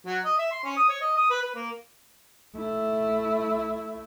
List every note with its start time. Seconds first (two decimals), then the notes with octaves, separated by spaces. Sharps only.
0.06 F#3
0.24 D#5
0.38 E5
0.52 C6
0.64 C#4
0.77 D#6
0.89 C#5
1.01 D#5
1.16 D#6
1.30 B4
1.42 B4
1.55 A#3
2.56 A3 E4